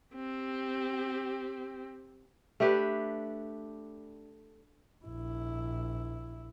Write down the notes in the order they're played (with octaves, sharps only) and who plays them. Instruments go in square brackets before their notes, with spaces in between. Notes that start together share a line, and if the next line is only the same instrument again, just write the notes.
[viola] C4 G4
[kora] A3 D4 G4 B4
[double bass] A#1 E4